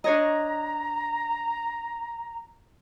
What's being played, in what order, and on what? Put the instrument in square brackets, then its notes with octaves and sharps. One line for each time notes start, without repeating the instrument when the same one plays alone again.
[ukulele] D4 C#5 D#5 [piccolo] A#5